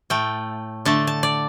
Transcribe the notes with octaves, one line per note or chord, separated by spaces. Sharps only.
A2 A3 G5
D3 A3 A5
A5
D5